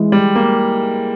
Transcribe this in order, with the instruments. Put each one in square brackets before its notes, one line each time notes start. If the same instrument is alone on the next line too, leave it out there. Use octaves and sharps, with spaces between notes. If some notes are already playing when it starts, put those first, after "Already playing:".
Already playing: [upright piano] E3 G#3 E4 G#4
[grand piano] G3
A#3